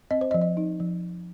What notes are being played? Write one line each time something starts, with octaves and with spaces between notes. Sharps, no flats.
C4 D#5
C5
D#5
F3
D#5
D#4
F3